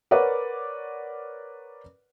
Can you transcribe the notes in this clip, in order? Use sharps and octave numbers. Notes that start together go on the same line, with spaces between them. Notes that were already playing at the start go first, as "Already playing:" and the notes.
A#4 B4 C#5 D5 F#5